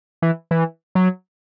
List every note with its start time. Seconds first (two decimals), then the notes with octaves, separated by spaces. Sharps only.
0.22 E3
0.51 E3
0.95 F#3